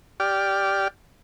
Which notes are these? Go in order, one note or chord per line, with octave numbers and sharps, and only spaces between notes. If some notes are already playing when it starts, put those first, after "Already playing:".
G4 D5 F6